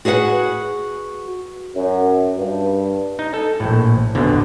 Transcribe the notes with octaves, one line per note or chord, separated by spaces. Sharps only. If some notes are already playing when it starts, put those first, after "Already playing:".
F#4 G#4 B4 E5 F#5
F#2
G2
D#4
A4
A#1 A2
A1 E2 B2 D3